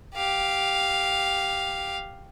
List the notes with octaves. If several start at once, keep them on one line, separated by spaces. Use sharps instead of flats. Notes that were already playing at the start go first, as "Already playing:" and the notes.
G4 F5